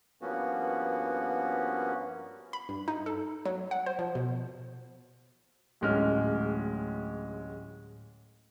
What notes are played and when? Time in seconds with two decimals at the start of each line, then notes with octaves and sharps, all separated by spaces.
0.22 G2 F3 A#3 B3 C#4 F#4
2.53 B5
2.69 G2
2.88 D#4
3.06 A4
3.46 F#3
3.71 F#5
3.86 C5
3.99 F3
4.15 B2
5.81 D1 A1 G#3 C#4 F6